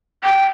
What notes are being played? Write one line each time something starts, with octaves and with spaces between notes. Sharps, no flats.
G5